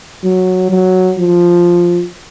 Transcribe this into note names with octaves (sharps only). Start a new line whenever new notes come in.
F#3
F#3
F3